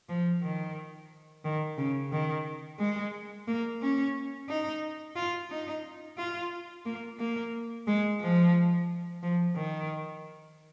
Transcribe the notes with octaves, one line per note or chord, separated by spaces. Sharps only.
F3
D#3
D#3
C#3
D#3
G#3
A#3
C#4
D#4
F4
D#4
F4
A#3
A#3
G#3
F3
F3
D#3